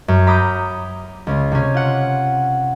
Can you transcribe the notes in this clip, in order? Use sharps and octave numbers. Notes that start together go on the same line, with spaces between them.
F#2
A#5 B5 D6 D#6 G6
C#2 C#4
C3 C#4
F4 F#5